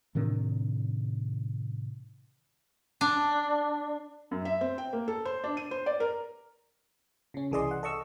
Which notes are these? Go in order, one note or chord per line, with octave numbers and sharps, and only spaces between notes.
A2 C3 D#3 D4
D4
F#2
E5
C4
G5
A#3
A4
C5
D4
D#7
C5
D5
A#4
C#3 C#4
C2 E3 G#4 D5 D#5 C6
F#5
A4 D#5 C#6 E6